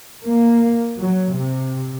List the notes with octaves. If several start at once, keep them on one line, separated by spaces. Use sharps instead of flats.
A#3
F#3
C3